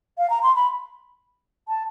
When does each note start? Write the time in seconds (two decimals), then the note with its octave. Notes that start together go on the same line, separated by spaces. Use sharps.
0.18 F5
0.30 A#5
0.43 C6
0.56 B5
1.68 A5